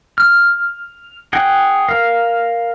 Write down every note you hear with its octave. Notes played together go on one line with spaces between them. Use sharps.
F6
G#4 F#5 G5
A#4 F5